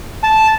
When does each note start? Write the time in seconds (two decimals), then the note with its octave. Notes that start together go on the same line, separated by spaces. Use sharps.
0.23 A5